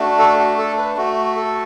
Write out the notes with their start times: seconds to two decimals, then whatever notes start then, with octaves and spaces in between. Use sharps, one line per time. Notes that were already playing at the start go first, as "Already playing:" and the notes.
Already playing: A3 D4 F#4
0.19 A4
0.40 F#4
0.58 A4
0.78 B4
0.97 A3 F#4
1.36 A4